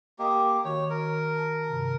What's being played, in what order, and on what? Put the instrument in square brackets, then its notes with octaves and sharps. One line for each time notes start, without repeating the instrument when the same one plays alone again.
[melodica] A#3 G4 [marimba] D#5 D#6
[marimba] D#3 F#4 [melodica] C#5
[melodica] A#4
[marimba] A5
G2 C3